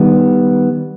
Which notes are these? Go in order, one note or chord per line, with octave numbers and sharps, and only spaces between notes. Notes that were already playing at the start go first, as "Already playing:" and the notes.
Already playing: D#3 G3 B3